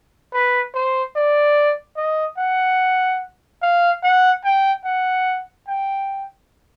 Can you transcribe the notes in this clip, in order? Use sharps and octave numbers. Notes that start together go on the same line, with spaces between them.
B4
C5
D5
D#5
F#5
F5
F#5
G5
F#5
G5